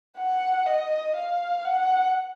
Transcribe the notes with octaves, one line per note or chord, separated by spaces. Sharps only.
F#5
D#5
F5
F#5